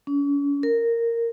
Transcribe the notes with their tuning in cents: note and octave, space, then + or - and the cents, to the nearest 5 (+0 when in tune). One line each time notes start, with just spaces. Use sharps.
C#4 +40
A#4 -10